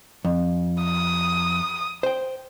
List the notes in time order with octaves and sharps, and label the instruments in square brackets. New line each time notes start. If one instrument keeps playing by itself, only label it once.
[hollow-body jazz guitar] F2
[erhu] D#6
[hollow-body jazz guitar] C5 G5